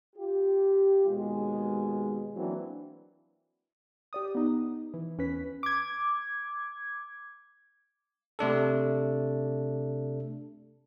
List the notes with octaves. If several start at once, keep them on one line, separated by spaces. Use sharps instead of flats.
F4 G4
D#2 B2 G#3
E3 F#3 A#3 C4 D4
G4 D5 D#6
B3 D#4
E3
E2 C#4 B4 B6
D6 G#6
C3 A3 D4 A4